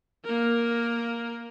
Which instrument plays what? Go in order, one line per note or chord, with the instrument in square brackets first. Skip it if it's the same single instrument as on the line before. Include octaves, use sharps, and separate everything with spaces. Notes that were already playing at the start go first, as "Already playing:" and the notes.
[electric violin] A#3 A#4